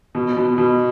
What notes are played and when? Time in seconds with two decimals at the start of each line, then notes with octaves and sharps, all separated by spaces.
0.15 B2
0.37 B2
0.58 B2